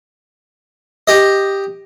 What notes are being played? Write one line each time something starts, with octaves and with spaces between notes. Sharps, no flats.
G4 D#5